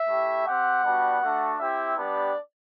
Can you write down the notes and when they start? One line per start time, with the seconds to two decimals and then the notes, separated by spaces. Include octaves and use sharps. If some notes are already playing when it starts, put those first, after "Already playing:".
Already playing: E5
0.08 A3 E4 G4
0.46 C4 G4 F#5
0.83 G3 B3 D4 F#4
1.21 A3 D4 F#4
1.59 C4 E4 G4 E5
1.96 G3 B3 D4 G4 D5